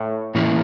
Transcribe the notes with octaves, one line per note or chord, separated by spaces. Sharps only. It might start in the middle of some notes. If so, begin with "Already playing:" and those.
Already playing: A2
A2 E3 A#3 C#4 E4